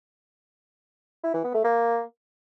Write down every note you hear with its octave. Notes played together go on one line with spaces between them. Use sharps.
E4
E3
B3
A3
A#3